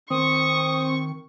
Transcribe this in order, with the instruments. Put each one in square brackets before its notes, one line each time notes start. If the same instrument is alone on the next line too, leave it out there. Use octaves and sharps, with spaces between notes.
[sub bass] D#3 [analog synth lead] C4 [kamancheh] C#6 [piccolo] D#6